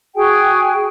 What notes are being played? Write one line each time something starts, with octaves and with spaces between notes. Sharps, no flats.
F#4 G#4 G5 G#5